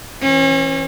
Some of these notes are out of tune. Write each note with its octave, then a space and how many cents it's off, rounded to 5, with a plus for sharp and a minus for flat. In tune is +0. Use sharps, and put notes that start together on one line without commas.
E3 +0 C#4 -40